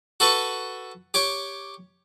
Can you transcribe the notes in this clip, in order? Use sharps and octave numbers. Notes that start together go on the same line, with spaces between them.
F#4 A4 B4 C#6
G4 C#5 D6